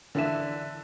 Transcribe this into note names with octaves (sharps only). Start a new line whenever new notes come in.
D3 E3 D4 E5 E7